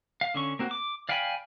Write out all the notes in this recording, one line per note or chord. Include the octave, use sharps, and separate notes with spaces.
F5
D3 C#4 C#6
A#3 C4 F#4
D6
D5 F5 G5 G#5 B5